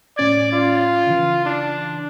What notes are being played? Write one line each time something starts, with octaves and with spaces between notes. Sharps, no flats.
A2 C#4 D5 G#6
F4
C#3 E3
D4